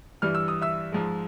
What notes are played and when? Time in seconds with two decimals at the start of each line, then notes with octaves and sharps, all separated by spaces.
0.22 G2 E3 G3 F6
0.35 E6
0.48 D#6
0.62 E5 E6
0.92 G#2 F3 G#3